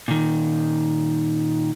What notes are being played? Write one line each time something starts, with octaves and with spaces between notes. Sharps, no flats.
A#2 D#3